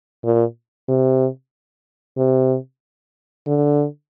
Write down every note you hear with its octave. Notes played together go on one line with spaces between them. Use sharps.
A#2
C3
C3
D3